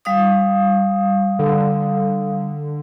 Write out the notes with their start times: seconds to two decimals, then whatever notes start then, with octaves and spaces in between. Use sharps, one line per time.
0.05 G3 F5 D#6
1.39 D3